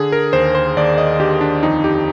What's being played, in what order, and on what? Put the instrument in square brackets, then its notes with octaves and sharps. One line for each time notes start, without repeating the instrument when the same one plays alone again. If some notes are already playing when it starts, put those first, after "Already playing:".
Already playing: [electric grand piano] D3 G#4
A#4
D#2 C5
C5
D#2 D5
D#5
D3 G4
D4
F2 D#4
G4